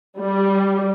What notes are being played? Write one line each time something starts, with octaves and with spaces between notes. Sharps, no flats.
G3